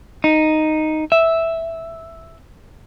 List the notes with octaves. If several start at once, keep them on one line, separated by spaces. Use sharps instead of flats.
D#4
E5